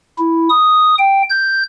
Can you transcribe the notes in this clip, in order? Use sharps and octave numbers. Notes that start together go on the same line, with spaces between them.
E4
D#6
G5
G6